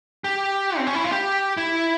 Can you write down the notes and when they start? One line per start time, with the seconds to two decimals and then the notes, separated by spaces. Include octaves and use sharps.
0.24 G4
0.78 C4
0.87 C#4
0.95 E4
1.04 F4
1.12 G4
1.57 E4